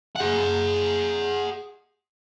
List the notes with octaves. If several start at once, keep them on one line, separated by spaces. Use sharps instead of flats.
G#4 F#5